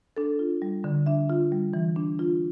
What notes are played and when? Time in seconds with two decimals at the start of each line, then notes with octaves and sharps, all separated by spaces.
0.17 D4 A4
0.39 F4
0.62 G3
0.84 D3
1.06 D4 E5
1.30 F4
1.52 G3
1.73 E3
1.96 D4
2.19 F4